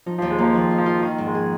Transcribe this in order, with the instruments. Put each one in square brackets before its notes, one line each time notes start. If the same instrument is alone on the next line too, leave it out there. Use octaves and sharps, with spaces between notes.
[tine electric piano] F3 [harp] D#4
[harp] D#2 [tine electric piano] F3
[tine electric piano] G#3
[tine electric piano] F3 [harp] A#3
[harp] F2 [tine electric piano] D#3
[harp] F4
[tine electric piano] F3
[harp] F4
[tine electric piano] D#3 [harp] F4
[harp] G#2
[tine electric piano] G#3
[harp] G#4